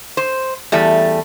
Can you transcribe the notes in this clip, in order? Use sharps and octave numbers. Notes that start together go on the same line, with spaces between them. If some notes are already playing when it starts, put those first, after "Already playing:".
C5
E2 G3 A3